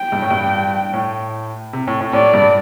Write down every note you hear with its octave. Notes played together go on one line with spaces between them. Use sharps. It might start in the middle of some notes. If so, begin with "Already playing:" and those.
Already playing: G5
G2
A2
G2
A2
C3
A2
A2
A2 D5
G2